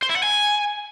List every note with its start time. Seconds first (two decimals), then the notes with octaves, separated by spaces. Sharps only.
0.02 C5
0.09 E4
0.16 F#5
0.23 G#5